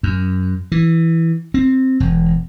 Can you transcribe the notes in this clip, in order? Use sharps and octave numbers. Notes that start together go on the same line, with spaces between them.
F#2
E3
C4
E1